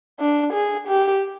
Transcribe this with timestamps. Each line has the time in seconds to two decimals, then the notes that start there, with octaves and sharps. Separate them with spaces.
0.19 D4
0.53 G#4
0.88 G4